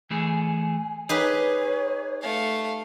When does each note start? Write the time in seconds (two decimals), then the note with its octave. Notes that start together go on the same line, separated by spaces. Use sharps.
0.10 E3 A3 G#4 G#5
1.09 D#4 G4 G#4 B4 C#5
2.22 A3 F5